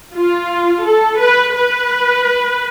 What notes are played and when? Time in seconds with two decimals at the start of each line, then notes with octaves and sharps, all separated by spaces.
0.15 F4
0.85 A4
1.21 B4
1.56 B4